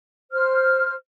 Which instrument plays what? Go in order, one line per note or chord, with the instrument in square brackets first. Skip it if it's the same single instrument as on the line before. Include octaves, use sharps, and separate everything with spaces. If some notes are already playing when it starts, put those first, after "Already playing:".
[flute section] C5 F6